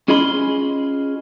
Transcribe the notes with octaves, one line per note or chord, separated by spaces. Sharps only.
C#4 F4 G#4 D#5 B5 C6